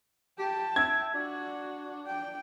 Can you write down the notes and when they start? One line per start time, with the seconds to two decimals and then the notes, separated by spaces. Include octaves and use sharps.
0.39 G4 G5 A5
0.76 E5 G#6
1.14 D4 F#4
2.07 G5